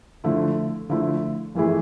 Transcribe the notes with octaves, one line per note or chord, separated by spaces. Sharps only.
D3 F3 A3 E4
D3 F3 A3 E4
F2 E3 A3 E4 G#4